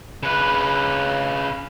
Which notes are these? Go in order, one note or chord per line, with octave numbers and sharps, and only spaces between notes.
C#3 B4